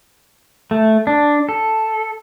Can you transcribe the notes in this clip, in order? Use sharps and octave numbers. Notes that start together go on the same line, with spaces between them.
A3
D4
A4